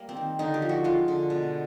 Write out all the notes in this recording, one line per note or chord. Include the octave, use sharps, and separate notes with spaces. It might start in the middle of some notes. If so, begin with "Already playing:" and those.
Already playing: G3 A#3
C4
D#3
D3 D#4
G4
F3
F#4
G#3 F4
D3
B2